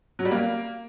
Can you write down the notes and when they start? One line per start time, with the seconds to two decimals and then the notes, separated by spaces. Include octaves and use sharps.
0.19 F#3
0.25 G3
0.31 A#3